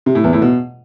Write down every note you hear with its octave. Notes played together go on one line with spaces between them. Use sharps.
C3
A2
E2
A2
B2